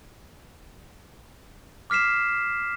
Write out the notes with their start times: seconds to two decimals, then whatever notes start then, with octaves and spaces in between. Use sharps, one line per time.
1.90 D6 F6 B6 C7 E7